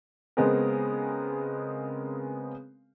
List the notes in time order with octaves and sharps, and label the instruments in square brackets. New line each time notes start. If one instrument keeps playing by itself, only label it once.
[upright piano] C#3 G#3 B3 C4 G#4 A#4